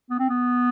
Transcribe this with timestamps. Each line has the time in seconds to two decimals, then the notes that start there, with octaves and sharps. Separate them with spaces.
0.10 B3
0.19 C4
0.29 B3